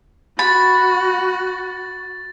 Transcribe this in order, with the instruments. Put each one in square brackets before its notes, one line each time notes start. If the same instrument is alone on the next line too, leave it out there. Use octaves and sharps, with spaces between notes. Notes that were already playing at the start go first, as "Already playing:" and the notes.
[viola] F#4 [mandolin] B5 [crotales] A6